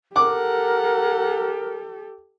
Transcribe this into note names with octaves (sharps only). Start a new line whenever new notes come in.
G4 A4 A#4 F#5 D6